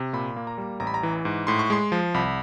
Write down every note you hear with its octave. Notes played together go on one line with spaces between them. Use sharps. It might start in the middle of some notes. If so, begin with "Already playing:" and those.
Already playing: C3
A#2 B5
A#3
A#5
G3
A1 A#5
B5
A#5
E3
G#2
A2 C6
C#6
G#3 C6
F3
C2 B5